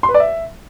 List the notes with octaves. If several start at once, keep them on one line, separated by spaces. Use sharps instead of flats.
C6
B4
D5
E5